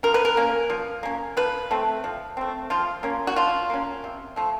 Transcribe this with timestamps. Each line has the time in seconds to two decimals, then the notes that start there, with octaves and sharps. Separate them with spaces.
0.03 F3 A#4
0.14 B4
0.25 A#4
0.37 A#3 C#4
0.70 F3
1.03 A#3 C#4
1.37 F3 B4
1.71 A3 C4
2.04 F3
2.37 A3 C4
2.70 F3 F4
3.03 A#3 C#4
3.27 F#4
3.36 F3 F4
3.70 A#3 C#4
4.04 C3
4.36 F3 A3